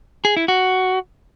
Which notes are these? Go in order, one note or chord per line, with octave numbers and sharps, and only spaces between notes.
G#4
E4
F#4